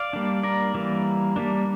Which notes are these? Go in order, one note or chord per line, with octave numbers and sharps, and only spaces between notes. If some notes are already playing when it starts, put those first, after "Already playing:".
Already playing: D5 F5
G3 A#3 D4
A#4 D5
E3 G3 A#3
G3 A#3 D4